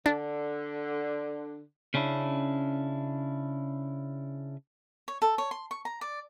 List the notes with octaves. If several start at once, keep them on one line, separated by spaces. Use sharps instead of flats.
D3 D4
C#3 C#4 D4 E4
C#5
A4
C#5
C6
C#6
A#5
D5